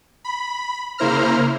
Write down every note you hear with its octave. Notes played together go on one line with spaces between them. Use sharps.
B5
C#3 A#3 E4 C5 A#5 F6